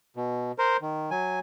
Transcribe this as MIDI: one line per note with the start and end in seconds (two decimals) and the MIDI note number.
0.16 0.52 47
0.59 0.77 70
0.59 0.77 72
0.81 1.10 51
1.11 1.39 54
1.11 1.39 80